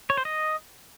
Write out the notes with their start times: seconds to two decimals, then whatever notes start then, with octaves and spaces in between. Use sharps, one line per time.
0.10 C#5
0.17 C5
0.25 D#5